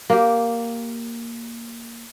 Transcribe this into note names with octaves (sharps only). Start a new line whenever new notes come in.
A#3 G4